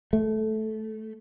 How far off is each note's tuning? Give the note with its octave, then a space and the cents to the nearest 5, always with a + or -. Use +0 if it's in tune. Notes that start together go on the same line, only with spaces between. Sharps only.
A3 -15